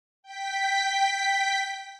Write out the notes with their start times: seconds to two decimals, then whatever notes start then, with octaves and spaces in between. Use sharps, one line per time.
0.23 G5 B6